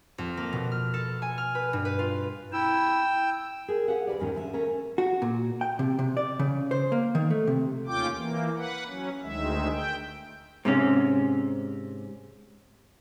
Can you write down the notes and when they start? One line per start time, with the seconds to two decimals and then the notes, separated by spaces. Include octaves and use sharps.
0.18 F2
0.37 A#3
0.53 B2
0.72 F6
0.94 A4
1.22 G#5
1.38 F6
1.55 B4
1.73 G2
1.85 B4
1.99 F4
2.52 E4 G5 E6
3.68 G#4 A#4
3.88 G4 G#4 F5 F#5
4.07 D2 B4 D5
4.20 E2 G#2 D#3 C#4 G4 A#4
4.34 D3 C#4 G#4 E5
4.53 A3 C#4 A#4
4.98 F#4
5.22 A#2
5.61 G5
5.79 C3
5.99 C3
6.17 D5
6.39 C#3
6.71 C5
6.92 A#3
7.15 D#3
7.30 A3
7.47 C3
7.87 D#2 C#4 F4 G5 D6
8.17 E3 A#3
8.56 B4 F#5
8.88 F#3 C#4
9.23 D2 D#3 G#3 E5
9.72 G5
10.65 G#2 C3 C#4